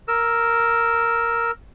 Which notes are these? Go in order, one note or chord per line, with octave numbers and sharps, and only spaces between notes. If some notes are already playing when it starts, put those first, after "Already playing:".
A#4 E6